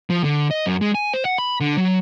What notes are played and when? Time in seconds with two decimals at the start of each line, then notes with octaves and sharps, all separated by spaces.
0.10 F3
0.24 D3
0.51 D#5
0.66 F#2
0.81 G#3
0.95 G#5
1.14 C5
1.25 F#5
1.38 B5
1.60 D3
1.77 F#3